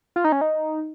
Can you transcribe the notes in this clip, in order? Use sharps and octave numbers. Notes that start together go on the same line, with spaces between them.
F4
D#4
C#4
D#4